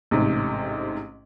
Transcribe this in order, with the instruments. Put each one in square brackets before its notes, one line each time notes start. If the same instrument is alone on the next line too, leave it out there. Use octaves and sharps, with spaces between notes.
[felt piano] A1 G#2 C3